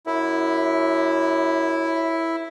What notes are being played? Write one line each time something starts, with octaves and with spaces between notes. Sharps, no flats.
F#2 E4